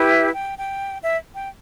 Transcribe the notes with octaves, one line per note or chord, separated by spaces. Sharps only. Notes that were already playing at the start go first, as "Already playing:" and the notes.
Already playing: E4 G4 B4
E5
G5
G5
E5
G5